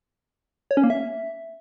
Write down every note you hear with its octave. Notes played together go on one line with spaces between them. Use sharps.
C#5
C#4
A#3
E5